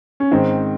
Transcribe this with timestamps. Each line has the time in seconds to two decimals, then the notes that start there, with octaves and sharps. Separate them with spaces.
0.20 C#4
0.31 G#2 D#3 C4